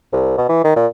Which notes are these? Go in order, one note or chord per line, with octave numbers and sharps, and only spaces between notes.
C2
B2
E3
D#3
A#2